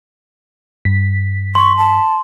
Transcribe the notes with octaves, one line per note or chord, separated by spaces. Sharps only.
G2 B6
C6 C#6
A5